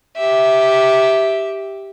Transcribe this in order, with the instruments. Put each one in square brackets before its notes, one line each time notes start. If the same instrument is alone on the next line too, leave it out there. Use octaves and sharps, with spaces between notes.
[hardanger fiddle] G4 E5